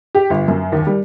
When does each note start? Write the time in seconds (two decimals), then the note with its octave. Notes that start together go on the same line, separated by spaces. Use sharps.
0.15 G4
0.30 G1
0.48 F#2
0.72 D#2
0.87 G3